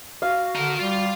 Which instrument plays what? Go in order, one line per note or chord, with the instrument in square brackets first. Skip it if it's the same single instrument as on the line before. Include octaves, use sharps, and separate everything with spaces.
[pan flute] F#4 [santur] F5
[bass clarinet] D3 [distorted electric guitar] D#4 A#4
[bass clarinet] G3 [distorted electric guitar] F4